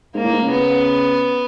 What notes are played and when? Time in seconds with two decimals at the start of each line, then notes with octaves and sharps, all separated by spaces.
0.15 G#2 A#3
0.24 A2
0.33 G#2
0.42 C#3
0.51 B3